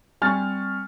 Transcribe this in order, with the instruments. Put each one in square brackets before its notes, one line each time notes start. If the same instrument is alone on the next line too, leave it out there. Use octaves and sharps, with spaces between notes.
[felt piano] G3 C4 C#6 [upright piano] G#5 F6 A6